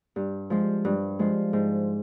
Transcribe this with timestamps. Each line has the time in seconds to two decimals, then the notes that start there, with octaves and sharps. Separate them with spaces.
0.16 G2
0.50 F3 G#3
0.85 G2
1.19 F3 G#3
1.53 G#2